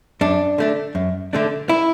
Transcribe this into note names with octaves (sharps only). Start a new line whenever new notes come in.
F#2 D4
D3 A3 D4
F#2
D3 A3 D4
E4